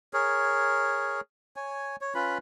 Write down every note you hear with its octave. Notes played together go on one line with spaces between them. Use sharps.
G#4 A#4 C#5
C#5 G#5
C#5
C#4 F4 B4 B5